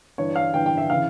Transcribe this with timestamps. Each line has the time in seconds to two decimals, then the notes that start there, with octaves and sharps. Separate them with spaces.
0.18 G2 E3 C#5
0.36 F5
0.54 G2 E3 G5
0.66 G5
0.78 E5
0.90 C#3 E3 F5